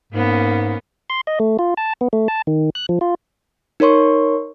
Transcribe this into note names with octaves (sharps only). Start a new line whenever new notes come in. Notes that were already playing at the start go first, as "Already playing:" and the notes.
G#2 A#3 B3 C#4
C6
D#5
A3
F4
A5
B3
A3
A5
D#3
F#6
F3
F4
D#4 A#4 C#5 C6 C#6